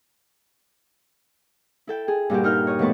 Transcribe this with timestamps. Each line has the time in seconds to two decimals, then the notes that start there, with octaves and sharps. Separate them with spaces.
1.87 E4 A4 G5
2.08 G#4
2.30 G2 A#2 F#4 G4
2.43 G3 D#4 A#4 F6 G6
2.67 C#5 D#5
2.79 B2 F3 A3 B4 A5 C#6